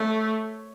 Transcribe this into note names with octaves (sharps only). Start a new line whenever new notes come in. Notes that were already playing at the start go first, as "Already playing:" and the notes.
Already playing: A3 C#5